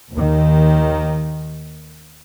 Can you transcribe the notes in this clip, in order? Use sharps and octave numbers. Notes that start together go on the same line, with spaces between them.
D#2 D#3